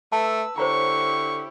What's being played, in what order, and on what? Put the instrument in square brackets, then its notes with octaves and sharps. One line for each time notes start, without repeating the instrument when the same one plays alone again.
[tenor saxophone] A3 [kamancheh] B4 E6 [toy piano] A5
[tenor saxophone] D3 [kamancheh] E4 G4 [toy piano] C5 C#5 A#5 [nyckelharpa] C#6